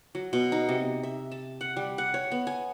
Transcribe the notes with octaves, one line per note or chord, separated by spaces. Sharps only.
F#3
B2
D#4
C3
E5
A5
F#5
G3
F#5
C#5
B3
G#5